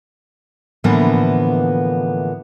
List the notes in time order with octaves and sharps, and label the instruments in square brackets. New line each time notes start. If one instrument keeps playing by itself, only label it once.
[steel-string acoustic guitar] A2 D3 E3 F3 A#3 B3